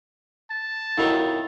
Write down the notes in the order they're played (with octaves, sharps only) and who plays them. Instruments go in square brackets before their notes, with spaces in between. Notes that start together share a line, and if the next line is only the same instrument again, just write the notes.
[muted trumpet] A5
[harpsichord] F2 D#3 F#3 [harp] E4